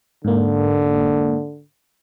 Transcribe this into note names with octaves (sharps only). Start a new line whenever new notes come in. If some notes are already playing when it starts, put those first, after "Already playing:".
G#2 D3 A#3